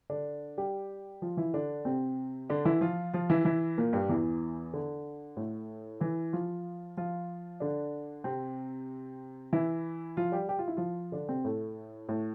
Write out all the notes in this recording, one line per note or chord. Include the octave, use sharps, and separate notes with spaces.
D3 D4
G3 G4
F3 F4
E3 E4
D3 D4
C3 C4
D3 D4
E3 E4
F3 F4
F3 F4
E3 E4
E3 E4
A#2 A#3
G2 G3
E2 E3
D3
A2 A3
E3 E4
F3 F4
F3 F4
D3 D4
C3 C4
E3 E4
F3 F4
G3 G4
G4
F4
E4
F3 F4
D3 D4
C3 C4
A2 A3
A2 A3